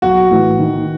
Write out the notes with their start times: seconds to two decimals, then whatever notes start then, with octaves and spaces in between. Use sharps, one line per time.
0.02 B1 F#4
0.30 A2 E3
0.59 D#3